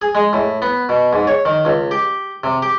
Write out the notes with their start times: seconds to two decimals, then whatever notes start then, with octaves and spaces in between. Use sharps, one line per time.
0.02 G#4
0.15 G#3
0.33 A2
0.62 B3
0.89 B2
1.13 G#2
1.27 C#5
1.45 D#3
1.65 C#2
1.91 G4
2.44 C3
2.62 G4